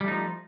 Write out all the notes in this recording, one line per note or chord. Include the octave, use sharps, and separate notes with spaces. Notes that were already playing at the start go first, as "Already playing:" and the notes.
F3 G3 A3 D#4